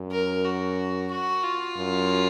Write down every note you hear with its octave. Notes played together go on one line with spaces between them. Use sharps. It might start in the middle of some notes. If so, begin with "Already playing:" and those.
Already playing: F#2
A#4
F#4
F#4
F4
F#2